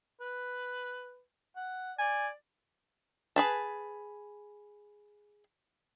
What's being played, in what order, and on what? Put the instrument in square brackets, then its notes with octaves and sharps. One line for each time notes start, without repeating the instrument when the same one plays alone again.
[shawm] B4
F#5
[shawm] D5 [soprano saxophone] G#5
[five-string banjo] G#4 B4 A5